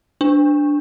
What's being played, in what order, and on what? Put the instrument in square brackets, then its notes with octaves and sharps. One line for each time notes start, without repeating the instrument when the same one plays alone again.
[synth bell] D4